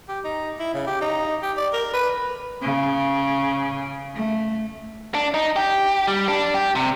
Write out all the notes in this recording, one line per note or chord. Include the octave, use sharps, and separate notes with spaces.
G4
D#4
E4
C#3
G4
D#4
G4
D5
A#4
B4
C#3
A3
D4
D#4
G4
G3
D4
G4
C3